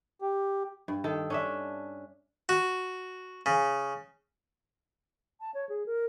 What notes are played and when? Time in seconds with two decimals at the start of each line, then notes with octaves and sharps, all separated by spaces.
0.22 G4
0.88 G2
1.04 D#3 A4
1.30 C#4 D4 E5
2.49 F#4
3.46 C#3
5.40 A5
5.54 C#5
5.69 G#4
5.86 A#4